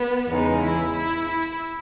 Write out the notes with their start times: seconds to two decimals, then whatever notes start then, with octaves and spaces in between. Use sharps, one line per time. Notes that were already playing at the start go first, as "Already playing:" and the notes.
Already playing: B3
0.28 E2 C#3 G#3 D#4
0.62 E4
0.95 E4
1.27 E4